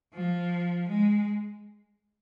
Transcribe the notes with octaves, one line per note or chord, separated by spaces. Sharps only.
F3
G#3